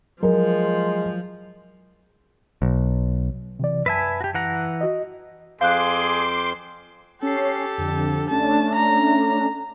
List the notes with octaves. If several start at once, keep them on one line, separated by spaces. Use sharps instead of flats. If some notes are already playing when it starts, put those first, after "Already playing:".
F3 F#3 G#3 A#4
B1
C3 E3 D5
F#2 B4 E5 G#5 A5
F#4 G4
E3 F#5 A#5
F#4 D#5
F2 G#4 C5 F5 C6 D6 F#6 G6
C#4 G4 A4 C7
F2 D3
A3 C#4 D4 A5
A#5